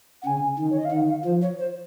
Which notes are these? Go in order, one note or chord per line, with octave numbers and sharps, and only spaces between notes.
F#5
C#3 G#5
D#3
C#5
D#5
F5
D#3 F#5
F5
F3 C5
C#5
C5